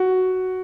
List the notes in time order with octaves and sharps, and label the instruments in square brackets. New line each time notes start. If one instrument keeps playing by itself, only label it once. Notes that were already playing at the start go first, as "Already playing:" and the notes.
Already playing: [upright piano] F#4